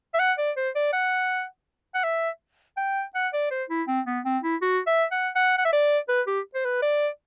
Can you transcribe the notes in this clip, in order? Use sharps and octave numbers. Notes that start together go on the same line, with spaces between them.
E5
F#5
D5
C5
D5
F#5
F#5
E5
G5
F#5
D5
C5
E4
C4
B3
C4
E4
F#4
E5
F#5
F#5
F#5
E5
D5
B4
G4
C5
B4
D5